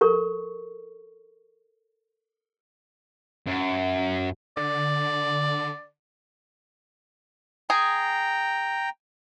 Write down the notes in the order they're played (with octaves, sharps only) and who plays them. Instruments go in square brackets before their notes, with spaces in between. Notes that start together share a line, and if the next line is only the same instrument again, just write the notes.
[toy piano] A4 A#4 C#6
[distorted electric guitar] F#2
[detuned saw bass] D3 [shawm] D5
[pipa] G#4 [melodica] G5 A#5